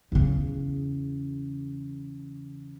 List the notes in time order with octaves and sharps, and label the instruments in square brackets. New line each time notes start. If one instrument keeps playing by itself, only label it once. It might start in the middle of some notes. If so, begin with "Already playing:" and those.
[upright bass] E2 C#3